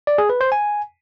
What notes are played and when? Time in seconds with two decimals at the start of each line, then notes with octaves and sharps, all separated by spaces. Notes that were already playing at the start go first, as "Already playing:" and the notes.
0.07 D5
0.18 G#4
0.29 B4
0.41 C5
0.52 G#5